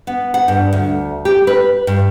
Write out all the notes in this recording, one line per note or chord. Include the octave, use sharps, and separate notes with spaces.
B3
F#5
G2
D2
G4
B4
G2